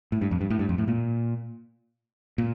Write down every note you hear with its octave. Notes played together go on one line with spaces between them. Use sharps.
A2
G2
F2
G2
A2
G2
F2
A2
A#2
A#2